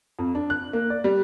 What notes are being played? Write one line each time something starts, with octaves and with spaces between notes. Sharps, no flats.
F2
D4
F#6
A#3
D5
G3